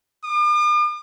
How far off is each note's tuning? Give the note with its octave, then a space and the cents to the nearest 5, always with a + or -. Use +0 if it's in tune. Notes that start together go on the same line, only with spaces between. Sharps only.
D6 +45